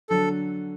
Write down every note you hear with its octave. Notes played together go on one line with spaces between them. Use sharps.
D3 F#3 A4